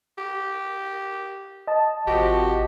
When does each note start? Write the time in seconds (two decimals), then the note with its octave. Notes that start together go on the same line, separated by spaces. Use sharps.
0.18 G4
1.67 D#5 A5
2.07 G#1 C3 F3 F#4 G4